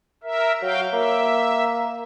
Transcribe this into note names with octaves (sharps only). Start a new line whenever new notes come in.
A#4 E5
F#3 F#4 F5 G5
A#3 E5